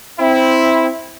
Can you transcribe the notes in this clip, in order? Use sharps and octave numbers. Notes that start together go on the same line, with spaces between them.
C4 E4